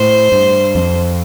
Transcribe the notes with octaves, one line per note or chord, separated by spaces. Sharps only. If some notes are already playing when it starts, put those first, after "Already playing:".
Already playing: A2 C5
G2
F2